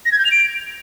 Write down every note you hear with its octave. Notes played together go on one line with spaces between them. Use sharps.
A#6
G#6
G6
F7
D7